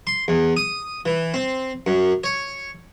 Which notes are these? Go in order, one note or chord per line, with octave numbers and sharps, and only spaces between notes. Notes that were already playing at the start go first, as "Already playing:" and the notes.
C6
E2
D#6
E3
C4
F#2
C#5